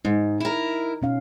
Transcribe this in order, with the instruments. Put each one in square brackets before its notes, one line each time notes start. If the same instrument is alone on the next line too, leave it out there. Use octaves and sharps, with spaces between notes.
[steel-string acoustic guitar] G#2 [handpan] D#4
[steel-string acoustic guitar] E4 A#4
[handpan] B2 C#4 F5